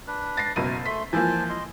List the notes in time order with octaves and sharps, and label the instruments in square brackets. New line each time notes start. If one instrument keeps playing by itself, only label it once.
[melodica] D4 B4
[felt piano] A6 A#6 C7
[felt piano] F#1 B2 D#7 [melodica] E4 A#4
[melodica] A3 C6 [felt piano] B6
[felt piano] E3 F3 A#3 [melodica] C5 G#5 A5
[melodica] D#5 C6